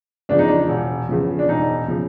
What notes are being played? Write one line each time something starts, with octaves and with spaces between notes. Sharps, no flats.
E2 C#3 F3 D4
D#4
D4
E1
E2 C#3 F3
D4
E1 D#4
C#3 F3